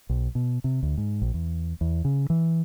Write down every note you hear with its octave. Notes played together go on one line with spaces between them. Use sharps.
B1
B2
C3
D2
G#2
A#1
E2
E2
C#3
E3